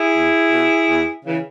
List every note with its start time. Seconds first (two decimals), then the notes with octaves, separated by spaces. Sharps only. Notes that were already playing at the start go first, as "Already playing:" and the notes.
Already playing: E4 G#4
0.13 E2
0.50 B2
0.87 E2
1.24 C#3 E3